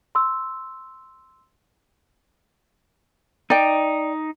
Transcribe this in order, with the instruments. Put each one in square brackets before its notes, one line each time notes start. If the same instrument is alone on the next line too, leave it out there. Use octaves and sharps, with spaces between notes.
[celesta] C6 E6
[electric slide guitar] D#4 [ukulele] D5 G5